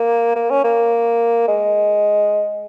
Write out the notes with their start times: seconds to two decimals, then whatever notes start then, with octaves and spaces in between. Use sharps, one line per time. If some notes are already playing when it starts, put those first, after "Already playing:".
Already playing: A#3
0.36 A#3
0.50 C#4
0.64 A#3
1.48 G#3